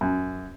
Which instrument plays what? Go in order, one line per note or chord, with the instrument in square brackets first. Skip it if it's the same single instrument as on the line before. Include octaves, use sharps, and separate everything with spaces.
[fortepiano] F#2